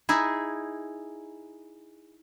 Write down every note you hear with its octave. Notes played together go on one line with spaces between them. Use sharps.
D#4 E4 G#4